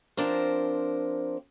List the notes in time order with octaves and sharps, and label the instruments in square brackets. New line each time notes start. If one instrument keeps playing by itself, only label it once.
[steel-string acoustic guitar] F3 C4 D4 A#4 C5